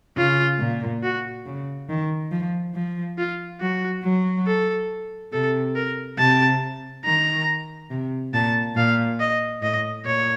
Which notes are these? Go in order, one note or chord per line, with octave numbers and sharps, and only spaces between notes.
C#3 F4
A#2
F#4
C#3
D#3
F3
F3
F4
F#3 F#4
F#3
A4
C3 A4
A#4
C3 A5
D#3 A#5
C3
A#2 A5
A#2 F5
D#5
A2 D#5
A#2 C#5